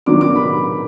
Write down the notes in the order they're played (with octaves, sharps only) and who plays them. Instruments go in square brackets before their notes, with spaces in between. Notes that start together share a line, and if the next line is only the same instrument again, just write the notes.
[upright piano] D#3 F#3 B3 D4 D6
D6
B5